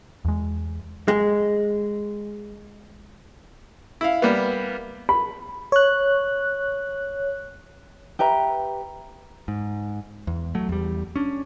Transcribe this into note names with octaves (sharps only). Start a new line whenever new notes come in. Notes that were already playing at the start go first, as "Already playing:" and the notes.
E2 G#3
G#3
E4 F5
G3 A#3 B3
B5
C#5 F#6
G4 B4 E5 A#5
G#2
E2
F#3 A3
E2 G3
C#4 D4